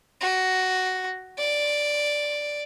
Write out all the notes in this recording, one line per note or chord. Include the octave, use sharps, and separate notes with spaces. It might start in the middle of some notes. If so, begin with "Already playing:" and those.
F#4
D5